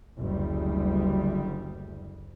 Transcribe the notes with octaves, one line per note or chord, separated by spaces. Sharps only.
F#1 D2 G3